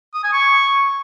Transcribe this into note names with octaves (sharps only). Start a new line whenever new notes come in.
D#6
G#5
C#6